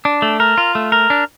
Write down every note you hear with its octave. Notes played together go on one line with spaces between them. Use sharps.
D4
A3
A#4
F4
A3
A#4
D4